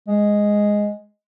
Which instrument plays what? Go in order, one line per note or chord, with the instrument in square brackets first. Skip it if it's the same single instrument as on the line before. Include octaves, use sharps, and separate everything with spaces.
[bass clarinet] G#3